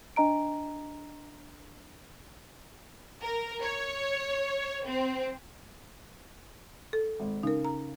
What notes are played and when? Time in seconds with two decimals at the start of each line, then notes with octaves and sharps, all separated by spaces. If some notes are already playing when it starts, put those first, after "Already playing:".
0.16 D4 D#5 A#5 D7
3.22 A#4
3.62 C#5
4.85 C4
6.93 A4
7.20 G#1
7.43 C#3 D#4 A#4
7.65 A#5